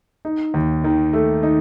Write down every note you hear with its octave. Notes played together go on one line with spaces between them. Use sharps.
D#4
D#2
D#3
A3
D#4